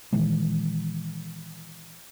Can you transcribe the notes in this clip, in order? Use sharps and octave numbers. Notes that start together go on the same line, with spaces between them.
A#2 D#3 E3 G#3